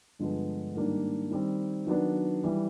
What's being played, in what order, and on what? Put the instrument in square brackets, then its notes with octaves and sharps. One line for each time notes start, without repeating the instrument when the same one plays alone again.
[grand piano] G2 D3 F3 G#3 B3
G#2 D#3 G3 A#3 D4
D#3 G3 C4
D#3 F#3 B3 D4
E3 G3